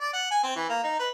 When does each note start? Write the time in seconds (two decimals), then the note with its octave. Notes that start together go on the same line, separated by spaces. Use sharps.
0.01 D5
0.13 F#5
0.31 G#5
0.43 C4
0.56 E3
0.69 A#3
0.83 D#4
0.99 B4